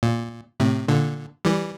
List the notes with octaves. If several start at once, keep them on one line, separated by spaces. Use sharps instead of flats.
A#2
A2 C3
A#2 D3
E3 G3